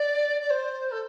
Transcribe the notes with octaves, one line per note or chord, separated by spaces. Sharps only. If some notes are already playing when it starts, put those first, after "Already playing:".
Already playing: D5
D5
C5
A4